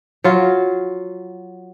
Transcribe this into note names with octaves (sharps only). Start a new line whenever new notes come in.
F#3 F4